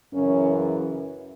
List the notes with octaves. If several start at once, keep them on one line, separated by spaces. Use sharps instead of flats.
F#2 C#3 E3 C#4